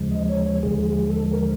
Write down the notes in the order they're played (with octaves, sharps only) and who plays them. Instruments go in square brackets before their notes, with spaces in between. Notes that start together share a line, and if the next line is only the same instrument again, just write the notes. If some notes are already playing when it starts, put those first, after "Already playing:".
Already playing: [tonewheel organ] D#2 C#3 F3 G#3
D#5
C#5
C#5
D#2 D3 F3 G#3 G#4
G#4
A4
A#4